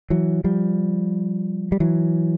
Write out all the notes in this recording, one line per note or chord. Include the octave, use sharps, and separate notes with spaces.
E3 F#3
F3 G3
G3
E3 F#3